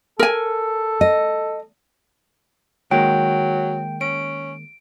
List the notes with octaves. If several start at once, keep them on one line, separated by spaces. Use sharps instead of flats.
A4 A#4 G#5
D#5
D#3 F#3 G#3 A#3 G5
C#4 D7